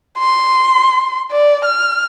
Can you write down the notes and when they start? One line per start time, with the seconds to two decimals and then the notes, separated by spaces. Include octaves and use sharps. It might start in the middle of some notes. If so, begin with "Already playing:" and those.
0.19 C6
1.32 D5
1.65 F6